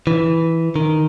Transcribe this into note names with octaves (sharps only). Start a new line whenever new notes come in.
E3
D#3